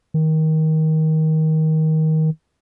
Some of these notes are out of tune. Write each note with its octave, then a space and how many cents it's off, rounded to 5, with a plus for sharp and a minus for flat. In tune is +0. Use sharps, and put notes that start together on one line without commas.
D#3 +20